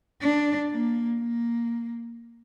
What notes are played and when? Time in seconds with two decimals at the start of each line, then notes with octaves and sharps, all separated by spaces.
0.22 D4
0.71 A#3
1.20 A#3